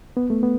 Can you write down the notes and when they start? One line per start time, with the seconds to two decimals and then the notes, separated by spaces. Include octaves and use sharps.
0.17 B3
0.30 A3
0.43 B3